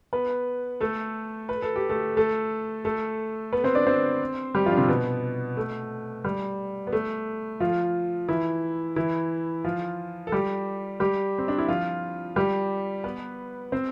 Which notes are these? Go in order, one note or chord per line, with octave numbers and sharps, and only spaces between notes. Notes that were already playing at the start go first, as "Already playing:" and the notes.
B3 B4
A3 A4
B4
A4
G4
A3 A4
A3 A4
A3 A4
B3 B4
C4 C5
D4 D5
C4 C5
G3 G4
F3 F4
D4
C3 C4
B2 B3
A3
G3
B3
A3
F3 F4
E3 E4
E3 E4
F3 F4
A4
G3 G4
G3 G4
C4
D4
E4
F3 F4
G3 G4
B3 B4
C4 C5